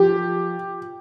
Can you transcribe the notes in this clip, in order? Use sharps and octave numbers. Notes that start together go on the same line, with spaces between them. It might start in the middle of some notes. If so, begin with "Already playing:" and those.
Already playing: F3 G4